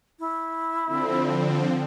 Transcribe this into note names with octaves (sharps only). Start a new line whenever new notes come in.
E4
D3 F3 C4